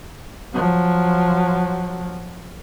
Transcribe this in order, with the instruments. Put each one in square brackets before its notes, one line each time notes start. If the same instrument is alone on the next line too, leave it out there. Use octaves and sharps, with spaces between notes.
[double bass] F3 F#3